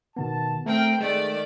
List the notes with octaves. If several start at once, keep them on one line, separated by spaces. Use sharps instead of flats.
B2 D#3 B3 A5
A3 C4 A#4 G5
D#3 G#3 A3 D5